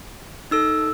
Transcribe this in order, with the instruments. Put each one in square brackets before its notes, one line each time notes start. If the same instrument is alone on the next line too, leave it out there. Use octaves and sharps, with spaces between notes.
[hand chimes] D#4 A4 E6